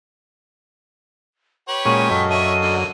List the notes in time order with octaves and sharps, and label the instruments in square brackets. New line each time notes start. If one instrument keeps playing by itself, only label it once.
[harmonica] G4 B4 C#5 [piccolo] F#7
[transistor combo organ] A#2 G#3 C#4 [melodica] F#4 [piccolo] D#7
[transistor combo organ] F#2 [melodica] A4 D#5 F5 [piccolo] B6
[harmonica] D4 C#5 E5 [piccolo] D#7
[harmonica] D3 F#3 A#3